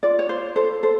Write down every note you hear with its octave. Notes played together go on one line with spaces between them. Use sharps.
F4 D5
C#5
F4 C5
A4 C5
A4 C5